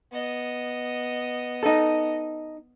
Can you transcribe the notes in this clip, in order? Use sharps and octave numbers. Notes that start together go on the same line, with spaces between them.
B3 D#5
D#4 A4